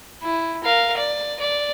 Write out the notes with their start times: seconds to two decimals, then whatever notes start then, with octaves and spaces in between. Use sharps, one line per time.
0.23 E4
0.64 A#4 F5
0.97 D5
1.39 D5